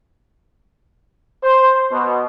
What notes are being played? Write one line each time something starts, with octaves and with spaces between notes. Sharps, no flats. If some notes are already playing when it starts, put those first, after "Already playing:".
C5
B2